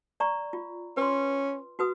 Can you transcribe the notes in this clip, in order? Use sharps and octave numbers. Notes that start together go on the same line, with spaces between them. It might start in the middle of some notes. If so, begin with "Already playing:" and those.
D5 A#5 C#6
F4
C#4 B4 C6
F#4 B4 D#6